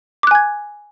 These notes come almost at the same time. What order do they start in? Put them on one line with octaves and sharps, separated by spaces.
D6 F#6 G#5 G#6